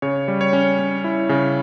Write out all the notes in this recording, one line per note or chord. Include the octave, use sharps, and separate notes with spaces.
C#3 C#5
G3
C#5
C#4
C#4
E4
C#3